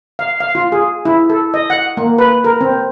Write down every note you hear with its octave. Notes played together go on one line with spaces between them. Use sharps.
F5
F5
F4
G#4
E4
A4
D#5
F#5
A#3
B4
A#4
C4